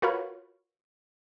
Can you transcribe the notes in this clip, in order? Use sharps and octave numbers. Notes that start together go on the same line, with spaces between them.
F4 F#4 A#4 B4 C#5